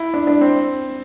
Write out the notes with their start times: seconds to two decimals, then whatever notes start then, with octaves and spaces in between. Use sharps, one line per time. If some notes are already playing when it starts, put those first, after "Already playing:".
Already playing: E4
0.14 D4
0.27 D4
0.41 C4